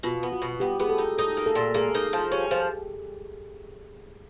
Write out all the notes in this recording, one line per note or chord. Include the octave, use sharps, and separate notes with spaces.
B2 F4
B3
F#4
B2
B3 G4
B3 G#4
A4
D#4
D#4 A4
A#3
A4
A#2
A#3 G#4
D#4
F3
G#4
C#4 G4
F3